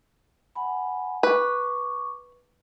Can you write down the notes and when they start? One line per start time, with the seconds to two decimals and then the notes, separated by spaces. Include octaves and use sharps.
0.55 F#5 G#5 B5
1.23 B4 C#6 D6